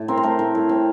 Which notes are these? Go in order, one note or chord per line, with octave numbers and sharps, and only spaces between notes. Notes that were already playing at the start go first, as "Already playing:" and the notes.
Already playing: A2
C4 A#4
C5
A3 A#4
A2 A#4
A2
C4